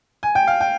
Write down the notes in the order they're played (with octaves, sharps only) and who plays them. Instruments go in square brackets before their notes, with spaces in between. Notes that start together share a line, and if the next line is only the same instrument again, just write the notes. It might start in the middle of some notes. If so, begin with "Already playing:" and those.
[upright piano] G#5
G5
F5
G5